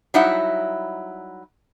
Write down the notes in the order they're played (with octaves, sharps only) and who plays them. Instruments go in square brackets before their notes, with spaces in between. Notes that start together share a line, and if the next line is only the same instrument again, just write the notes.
[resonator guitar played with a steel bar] F#3 G3 D#4 E4 E5 F#5